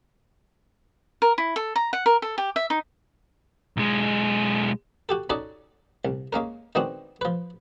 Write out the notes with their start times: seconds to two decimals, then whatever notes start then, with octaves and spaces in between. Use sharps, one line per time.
1.22 A#4
1.38 E4
1.56 A4
1.76 A#5
1.93 F#5
2.06 A#4
2.22 A4
2.38 G4
2.56 E5
2.70 D#4
3.77 B1 G#3
5.09 F#4 G4 A4
5.30 C#4 D#4 F#4 A4 C#5 D5
6.05 C2
6.33 G#3 A#3 C#4 A#4
6.75 D#3 G#3 B3 C4 D4 F#4
7.21 F3 B4